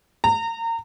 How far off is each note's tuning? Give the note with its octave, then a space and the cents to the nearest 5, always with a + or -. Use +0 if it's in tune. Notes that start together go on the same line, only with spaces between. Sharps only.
A#5 -30